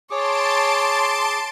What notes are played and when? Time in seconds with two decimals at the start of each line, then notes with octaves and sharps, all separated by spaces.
0.10 G#4 C#5 A5 C6 D6 D7